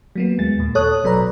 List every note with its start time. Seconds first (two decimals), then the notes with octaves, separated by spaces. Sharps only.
0.15 F#3 A#3 B3
0.38 D#2 G#3 A6
0.58 D#2 A#2
0.75 A4 C#5 D#6 F#6
1.03 A1 B2 F#3 B4 D5 A#5